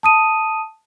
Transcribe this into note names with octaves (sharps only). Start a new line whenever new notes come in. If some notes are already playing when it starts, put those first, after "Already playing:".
A5 D#6 D#7